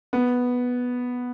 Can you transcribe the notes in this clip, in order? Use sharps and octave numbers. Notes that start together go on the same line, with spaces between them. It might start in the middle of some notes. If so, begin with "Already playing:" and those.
B3